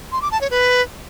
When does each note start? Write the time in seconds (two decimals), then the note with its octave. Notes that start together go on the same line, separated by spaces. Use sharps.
0.12 C6
0.22 D6
0.31 A5
0.41 C#5
0.51 B4